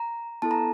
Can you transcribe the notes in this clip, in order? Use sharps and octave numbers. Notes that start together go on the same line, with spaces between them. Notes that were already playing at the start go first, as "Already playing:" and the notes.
Already playing: A#5
B3 E4 A4 A5
A#5